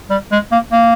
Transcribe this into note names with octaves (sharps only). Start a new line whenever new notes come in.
G3
G#3
A#3
A#3